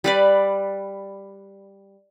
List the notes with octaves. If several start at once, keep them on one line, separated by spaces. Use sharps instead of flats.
G3 B4 D5